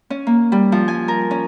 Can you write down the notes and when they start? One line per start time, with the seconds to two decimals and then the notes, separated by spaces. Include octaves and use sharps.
0.10 C#4
0.27 A#3
0.52 G3
0.72 F3
0.88 G#5
1.08 A#4
1.31 C#4